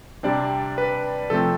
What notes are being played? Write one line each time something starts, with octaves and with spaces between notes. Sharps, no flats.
C3 G3 C4 D4 D5
B4
C3 F3 A3 C4 A4